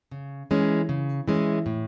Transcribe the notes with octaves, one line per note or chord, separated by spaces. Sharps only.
C#3
E3 G#3 C#4
C#3
E3 G#3 C#4
A2